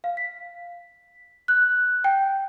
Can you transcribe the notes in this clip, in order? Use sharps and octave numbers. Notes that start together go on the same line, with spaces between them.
F5
B6
F#6
G5